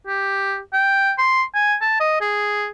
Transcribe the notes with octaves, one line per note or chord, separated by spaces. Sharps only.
G4
G5
C6
G#5
A5
D#5
G#4